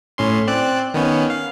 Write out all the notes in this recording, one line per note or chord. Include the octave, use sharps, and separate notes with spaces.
A2 C#4 C6
C4 D5 F#6
D#3 B3 C#4
F5